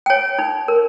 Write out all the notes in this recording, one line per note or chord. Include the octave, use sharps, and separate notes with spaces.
G5
C#5 G#5
D#4
A#4